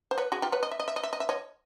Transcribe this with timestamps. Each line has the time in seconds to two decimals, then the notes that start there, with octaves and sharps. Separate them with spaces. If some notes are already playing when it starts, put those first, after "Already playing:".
0.11 C5
0.18 B4 C#5
0.32 F#4 G#4
0.42 F4 G4
0.52 B4 C#5
0.63 D#5
0.71 E5
0.80 D#5
0.88 E5
0.96 D#5
1.03 E5
1.13 D#5
1.20 E5
1.29 C#5 D#5